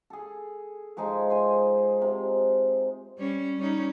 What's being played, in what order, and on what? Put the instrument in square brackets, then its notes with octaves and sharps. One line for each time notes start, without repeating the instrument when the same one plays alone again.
[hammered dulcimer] G#4 A4
F3 G#3 D#4 G#4
C5 G#5
C3
[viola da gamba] G3 C#4
G3 C#4 D#4